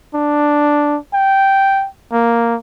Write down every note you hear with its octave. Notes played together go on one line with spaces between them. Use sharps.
D4
G5
A#3